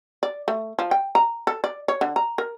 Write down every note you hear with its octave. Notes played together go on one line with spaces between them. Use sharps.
D5
A3
F3
G5
A#5
A4
D5
C#5
D3
A#5
A#4